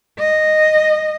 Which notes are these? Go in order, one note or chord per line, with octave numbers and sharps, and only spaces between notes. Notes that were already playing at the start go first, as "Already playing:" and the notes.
D#5